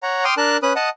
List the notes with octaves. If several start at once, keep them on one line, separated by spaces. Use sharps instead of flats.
C#5 F#5 A#5
G5 C6 D6 D#6 F6
D4 A#4 A5 F#6
C#4 B4 D#6 F#6
D#5 F#5 A5 D#6